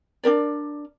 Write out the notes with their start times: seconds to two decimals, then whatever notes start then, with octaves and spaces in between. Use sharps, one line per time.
0.24 D4 D#4 A#4 D5